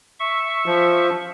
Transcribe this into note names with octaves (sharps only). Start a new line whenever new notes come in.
E5 C#6
F3